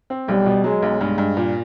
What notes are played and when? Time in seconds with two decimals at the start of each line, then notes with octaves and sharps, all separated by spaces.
0.10 C4
0.28 B1 G3
0.46 B2
0.64 F#3 G#3
0.82 B1
1.00 G2 G#3
1.18 G2
1.37 A#2